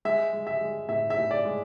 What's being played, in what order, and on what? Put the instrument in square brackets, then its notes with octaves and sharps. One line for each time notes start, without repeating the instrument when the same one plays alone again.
[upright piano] G#3 E5
G#3
E5
G#3
A2 E5
E5
A2
D5
G#3